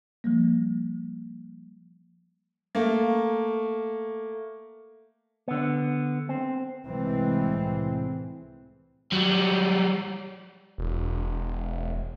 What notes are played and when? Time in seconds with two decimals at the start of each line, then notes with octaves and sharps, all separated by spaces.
0.24 F3 G3 A#3
2.75 A3 A#3
5.48 D3 B3
6.29 C4
6.87 C2 A2 E3 G#3 C4
9.12 F#3 G3
10.78 E1